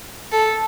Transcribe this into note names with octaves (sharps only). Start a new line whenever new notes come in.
A4